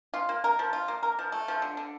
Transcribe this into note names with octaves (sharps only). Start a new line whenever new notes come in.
F4
A#3
A#4
F3
F4
A#3
A#4
F3
A3
F3
D3
D3